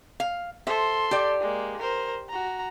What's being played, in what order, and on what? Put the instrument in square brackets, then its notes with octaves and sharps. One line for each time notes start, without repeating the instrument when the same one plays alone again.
[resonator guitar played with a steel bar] F5
[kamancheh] A4 C6 [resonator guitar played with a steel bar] C5 E5
[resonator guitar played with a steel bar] G4 D5
[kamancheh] G#3 A#3
A#4 C5
F#4 A#5